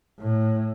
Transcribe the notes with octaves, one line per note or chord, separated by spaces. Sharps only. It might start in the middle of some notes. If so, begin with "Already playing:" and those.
A2